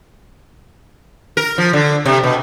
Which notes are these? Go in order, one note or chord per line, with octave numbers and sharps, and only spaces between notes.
A#4
F3
D3
C3
B2